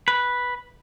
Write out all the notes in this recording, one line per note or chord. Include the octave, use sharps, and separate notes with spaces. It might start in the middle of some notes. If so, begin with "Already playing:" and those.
B4